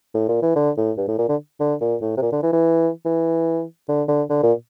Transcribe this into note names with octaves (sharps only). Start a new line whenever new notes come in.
A2
A#2
E3
D3
A2
G2
A2
A#2
D3
D3
A#2
A2
C3
A#2
D3
E3
E3
E3
D3
D3
D3
A#2